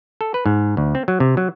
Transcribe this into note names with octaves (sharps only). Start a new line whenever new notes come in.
A4
B4
G#2
D2
C4
F#3
C3
F#3